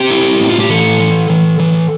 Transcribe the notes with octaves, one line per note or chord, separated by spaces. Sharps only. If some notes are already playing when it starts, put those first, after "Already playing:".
Already playing: C4 G4
E4
A2
F4
G4
E3 A4
E3
E3
E3